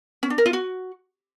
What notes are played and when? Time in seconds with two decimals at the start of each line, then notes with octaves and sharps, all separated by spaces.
0.23 C#4
0.30 D4
0.38 A#4
0.46 F4
0.53 F#4